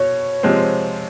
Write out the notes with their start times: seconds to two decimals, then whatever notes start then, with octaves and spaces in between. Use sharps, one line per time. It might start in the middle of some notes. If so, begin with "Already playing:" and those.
Already playing: B2 C#5
0.43 C3 F3 G#3 C4